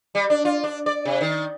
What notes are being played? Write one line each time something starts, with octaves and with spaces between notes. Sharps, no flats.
G3
D4
F4
D4
D5
C3
D#3